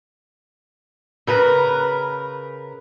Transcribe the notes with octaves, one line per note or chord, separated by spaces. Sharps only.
C#3 A#4 B4